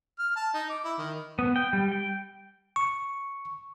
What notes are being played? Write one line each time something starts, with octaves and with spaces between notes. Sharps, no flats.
F6
A5
D#4
D6
E4
D#3
B3
G5
G3
G5
C#6